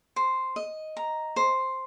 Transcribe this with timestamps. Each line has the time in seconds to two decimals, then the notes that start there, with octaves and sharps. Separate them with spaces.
0.16 C5
0.56 D#5
0.97 A#5
1.36 C5